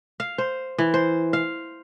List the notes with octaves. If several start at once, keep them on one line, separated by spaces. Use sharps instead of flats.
F5
C5
E3
C5
F5